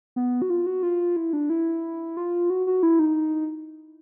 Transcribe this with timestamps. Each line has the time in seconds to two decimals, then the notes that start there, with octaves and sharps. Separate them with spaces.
0.16 B3
0.42 F#4
0.50 F4
0.66 F#4
0.83 F4
1.16 E4
1.33 D4
1.50 E4
2.17 F4
2.50 F#4
2.67 F#4
2.83 E4
2.99 D#4